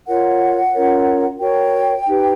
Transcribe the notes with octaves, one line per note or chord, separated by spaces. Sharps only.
F4 A#4 C#5 F#5
C#4 F4 A#4 C#5
F#4 A#4 C#5 G5
D#4 G4 B4